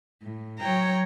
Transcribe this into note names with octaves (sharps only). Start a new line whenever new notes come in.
A2
F#3 C#5 G5 A#5